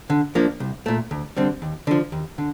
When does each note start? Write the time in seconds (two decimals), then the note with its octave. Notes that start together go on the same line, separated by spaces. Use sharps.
0.10 D3
0.35 F3 A#3 D4
0.60 C2
0.86 A#2 A3
1.11 D2
1.37 D3 G3 C4
1.62 D#2
1.87 D3 F3
2.12 D#2
2.38 D3